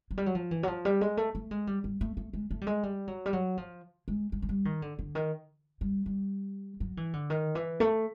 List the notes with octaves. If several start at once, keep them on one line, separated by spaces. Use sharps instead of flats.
F#3
G3
F#3
F3
E3
F#3
F3
G3
G#3
A3
A3
G#3
G3
G3
A3
A3
G#3
A3
G3
G#3
G3
F#3
G3
F#3
F3
G#3
G#3
G#3
G3
D#3
D3
D3
D#3
G3
G3
F#3
E3
D3
D#3
E3
A3